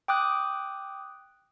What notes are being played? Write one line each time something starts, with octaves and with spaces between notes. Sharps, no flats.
G5 D6 D#6 F#6